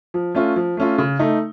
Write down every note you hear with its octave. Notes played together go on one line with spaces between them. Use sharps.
F3
A3 C#4 F4
F3
A3 C#4 F4
C#3
A3 D#4